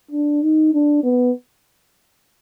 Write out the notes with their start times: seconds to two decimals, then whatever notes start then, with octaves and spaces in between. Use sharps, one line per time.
0.11 D4
0.42 D#4
0.74 D4
1.03 B3